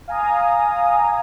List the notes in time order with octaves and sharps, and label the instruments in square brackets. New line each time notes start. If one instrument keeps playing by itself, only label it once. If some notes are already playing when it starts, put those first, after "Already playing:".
[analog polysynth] F5 G#5 A#5 D#6